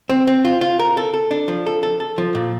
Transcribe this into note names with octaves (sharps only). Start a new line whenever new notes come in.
C4
C4
F4
F4
A#4
A4
A4
D4
F3
A4
A4
A4
F3
A#2